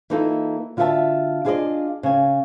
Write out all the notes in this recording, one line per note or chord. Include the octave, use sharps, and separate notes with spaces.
E3 A#3 D#4 F4 A4
D3 F4 F#4 A4 E5 A5
D4 F4 G#4 B4 D5 D#5
C#3 G#5